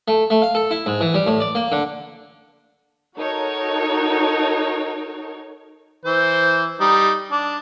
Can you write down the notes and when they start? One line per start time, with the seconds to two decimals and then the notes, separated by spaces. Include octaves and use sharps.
0.08 A3
0.30 A3
0.42 F5
0.55 A4
0.71 E4
0.86 G#2
1.01 E3
1.14 G3
1.27 A2
1.40 D5
1.55 A#3
1.72 D3
3.16 D#4 F#4 A4 A#4 C#5
6.05 E3 C5
6.80 G3 D#4
7.31 D4